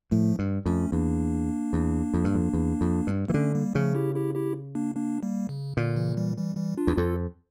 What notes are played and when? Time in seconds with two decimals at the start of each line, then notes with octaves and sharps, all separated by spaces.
0.11 A2 F3 A3
0.39 G2
0.66 F2 A3 C#4
0.92 E2 A#3 D4
1.73 E2
2.14 F2
2.24 G2
2.35 F2
2.53 E2
2.81 F2
3.07 G2
3.28 E3 A#3
3.34 D3 A3 C#4
3.55 G3 A#3
3.75 C#3 F3 A3
3.95 E4 G4
4.15 E4 G4
4.35 E4 G4
4.75 A#3 D4
4.96 A#3 D4
5.23 G3 A#3
5.49 C#3
5.77 A#2 D3
5.96 C#3 E3
6.16 E3 G3
6.36 E3 G3
6.57 E3 G3
6.77 D4 F4
6.87 E2
6.97 F2 F4 A4